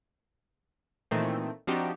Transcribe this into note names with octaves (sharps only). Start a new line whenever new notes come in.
A#2 D#3 E3 A3 C4
F3 C4 D4 D#4 F#4 G4